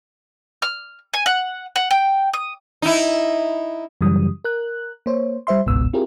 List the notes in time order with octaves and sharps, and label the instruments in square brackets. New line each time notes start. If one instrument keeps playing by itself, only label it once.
[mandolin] F6
G#5
F#5
F#5
G5
D#6
[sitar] D#4 E4
[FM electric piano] F#2 C#3 E3 F#3 G3 D#6
A#4 F#6
A#3 C5 C#5
G3 C5 E5 C6
G1 C#2 G#2 B2 B3 E6
C4 E4 F4 G4 G#4 A#4